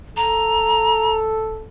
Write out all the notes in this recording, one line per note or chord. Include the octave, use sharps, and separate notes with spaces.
A4 A#5